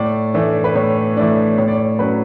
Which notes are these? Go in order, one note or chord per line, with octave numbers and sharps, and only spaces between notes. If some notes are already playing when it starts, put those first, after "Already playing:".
Already playing: A2 D5
E3 A3 D4
B4
A2 C#5
E3 A3 D4
A2 C#5
D5
C#5
F#3 C#4 B4